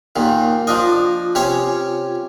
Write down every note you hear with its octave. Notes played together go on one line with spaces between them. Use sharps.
D#2 A#2 D#3
F3 D4 F4 D#5
C3 C#4 C#5